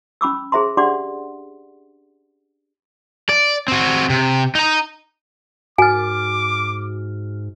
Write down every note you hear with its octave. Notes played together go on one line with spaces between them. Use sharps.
C#4 B5 D6 E6
G#4 C5 E5 A#5 C6
D4 G4 D5 F#5 C6 D6
D5
C4 F#4
C3
D#4 A#5
G#2 F#4 G#5 D6 F6